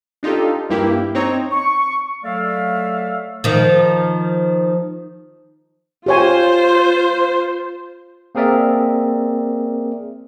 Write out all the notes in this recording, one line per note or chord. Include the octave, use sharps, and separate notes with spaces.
D4 D#4 F4 G4 A4
G2 A#3 E4 G4
C4 D#4 C#5 A#5
C#6
F#3 A3 A4 D5 E5 F5
D#3 F3
F4 G4 C5 C#5 G#5
A#3 C4 G#4 A#4 D5 E5